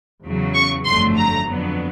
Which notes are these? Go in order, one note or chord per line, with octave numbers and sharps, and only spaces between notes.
E2 C#3 F#3
C#6
G1 F2 D3 F#3 A3 C6
A#5
F2 D3 F#3 B3